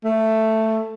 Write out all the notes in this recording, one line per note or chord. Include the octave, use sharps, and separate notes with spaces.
A3